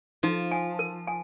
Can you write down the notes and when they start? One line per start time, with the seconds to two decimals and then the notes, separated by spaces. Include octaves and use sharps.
0.23 F3 D#4
0.51 G#5
0.79 A#4
1.07 G#5